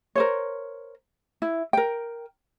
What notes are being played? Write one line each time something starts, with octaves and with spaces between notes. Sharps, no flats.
A#4 C5 C#5
E4
A#4 G5